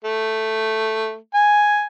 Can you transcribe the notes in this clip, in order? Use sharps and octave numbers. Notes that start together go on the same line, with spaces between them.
A3
G#5